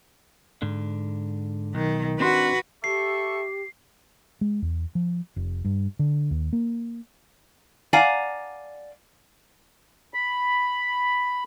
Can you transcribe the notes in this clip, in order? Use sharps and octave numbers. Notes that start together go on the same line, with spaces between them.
G#2 D3
B1 D#3
C4 D4 F#4 B4 C6
G4 A4 E5 C#6 C7
G#3
E2
F3
F1
G2
D3
D#2
A#3
D5 F5 F#5 G#5 A#5
B5